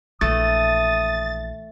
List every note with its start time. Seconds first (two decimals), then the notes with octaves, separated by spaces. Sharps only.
0.21 A#1 E3 A3 D#6 A6